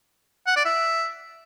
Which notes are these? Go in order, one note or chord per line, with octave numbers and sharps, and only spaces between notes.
F#5
D5
E5